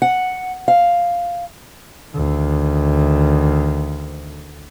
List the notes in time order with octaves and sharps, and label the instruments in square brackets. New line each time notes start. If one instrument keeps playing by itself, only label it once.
[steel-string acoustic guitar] F#5
F5
[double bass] D2 D#3